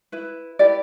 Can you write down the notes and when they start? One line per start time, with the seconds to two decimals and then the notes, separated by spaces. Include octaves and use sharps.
0.12 E4 B4
0.59 E4 G4 B4 D5